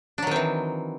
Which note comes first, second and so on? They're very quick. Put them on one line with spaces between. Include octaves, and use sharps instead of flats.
D4 F#3 D#3 C4 E3